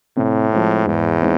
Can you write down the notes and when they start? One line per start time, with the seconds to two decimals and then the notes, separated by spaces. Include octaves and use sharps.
0.17 A2 C3
0.52 F3 G#3 C4
0.87 E2 G#2
1.22 G#3 C4 D#4